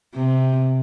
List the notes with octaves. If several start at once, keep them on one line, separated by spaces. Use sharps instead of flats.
C3